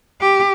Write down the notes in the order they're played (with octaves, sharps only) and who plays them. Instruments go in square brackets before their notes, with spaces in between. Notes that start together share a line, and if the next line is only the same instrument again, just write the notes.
[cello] G4